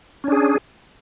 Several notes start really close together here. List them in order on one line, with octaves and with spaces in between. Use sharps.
C#4 D4 G#4